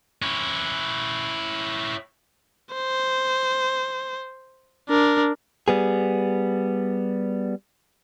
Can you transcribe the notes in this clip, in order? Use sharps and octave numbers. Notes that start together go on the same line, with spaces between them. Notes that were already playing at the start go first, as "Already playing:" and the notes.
C#4 E4
C5
D4 A#4
G3 B3 G#4